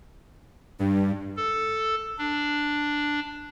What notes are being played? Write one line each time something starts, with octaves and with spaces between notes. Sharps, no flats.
G2 D4
A4
D4